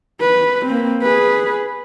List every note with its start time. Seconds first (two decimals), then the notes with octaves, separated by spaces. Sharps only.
0.21 B4
0.66 A#3 C4
1.02 G#4 B4